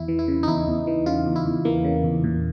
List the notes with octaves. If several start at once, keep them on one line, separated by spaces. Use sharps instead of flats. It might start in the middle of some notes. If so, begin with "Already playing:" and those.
Already playing: E2 E4
E3
E4
C#3
D#4
E2 E4
E2
E3
C#3 F4
E2
E4
E2
E3 A#3
C#3
E2
A#2